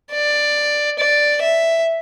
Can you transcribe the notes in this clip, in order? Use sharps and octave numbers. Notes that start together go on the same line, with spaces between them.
D5
D5
E5